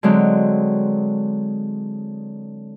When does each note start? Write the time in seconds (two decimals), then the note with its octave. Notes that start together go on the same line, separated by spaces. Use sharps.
0.03 D3 F#3 G#3 C4